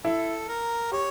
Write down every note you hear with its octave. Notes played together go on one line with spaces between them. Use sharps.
E4 A4
A#4
G4 C#5